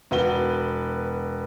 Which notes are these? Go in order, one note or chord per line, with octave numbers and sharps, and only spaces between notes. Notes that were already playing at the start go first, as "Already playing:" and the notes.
E1 F#4 B4 G7